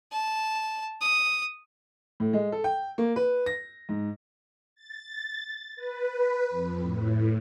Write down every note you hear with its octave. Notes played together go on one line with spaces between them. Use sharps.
A5
D#6
A2
G#3
A4
G5
A#3
B4
A#6
G#2
A6
B4
F2
A2